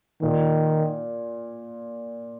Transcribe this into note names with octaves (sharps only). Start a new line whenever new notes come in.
A#2 D#3